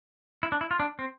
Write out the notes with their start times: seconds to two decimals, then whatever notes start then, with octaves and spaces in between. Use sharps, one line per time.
0.43 E4
0.52 D4
0.61 E4
0.71 F4
0.80 D4
0.99 C4